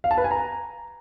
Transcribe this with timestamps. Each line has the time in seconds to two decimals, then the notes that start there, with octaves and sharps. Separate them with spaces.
0.04 F5
0.11 A5
0.17 B4
0.24 G#5
0.31 A#5